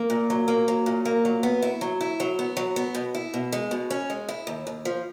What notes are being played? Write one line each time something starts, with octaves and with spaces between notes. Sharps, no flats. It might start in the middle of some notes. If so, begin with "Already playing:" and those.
Already playing: A#3
A#2
F#3
A#3
F#3
A#2
A#3
F#3
B3
E4
F#3
E4
F#3
B3
F#3
B3
B2
E4
B2
G#3
B2
C#4
G#3
E4
D#2
D#2
F3